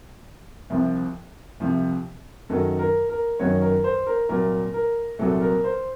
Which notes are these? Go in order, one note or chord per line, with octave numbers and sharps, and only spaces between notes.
C2 C3 F3
C2 C3 F3
F#2 D#3 F#3 A4
A#4
A#4
F#2 D#3 F#3 C#5
A#4
C5
A#4
C2 A#2 F#3 A#4
A#4
C2 A#2 F#3 A4
A#4
C5